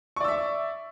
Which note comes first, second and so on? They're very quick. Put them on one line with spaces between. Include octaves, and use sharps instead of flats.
C#6 D5 E6 E5